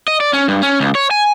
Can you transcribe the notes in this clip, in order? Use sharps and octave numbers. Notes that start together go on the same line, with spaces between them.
D#5
D5
C#4
G2
C#4
C#2
C#5
G#5